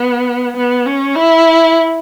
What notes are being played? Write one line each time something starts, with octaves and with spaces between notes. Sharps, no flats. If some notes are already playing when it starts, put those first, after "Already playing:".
Already playing: B3
B3
C#4
E4